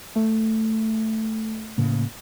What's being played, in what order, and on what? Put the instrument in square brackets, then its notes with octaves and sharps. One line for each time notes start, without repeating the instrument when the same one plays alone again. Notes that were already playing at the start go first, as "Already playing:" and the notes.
[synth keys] A3
[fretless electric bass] A2 C#3 A#3